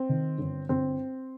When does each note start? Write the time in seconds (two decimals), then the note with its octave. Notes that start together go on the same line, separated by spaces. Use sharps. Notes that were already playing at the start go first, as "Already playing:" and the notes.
Already playing: C4
0.09 D#3
0.38 G1
0.69 G1 C4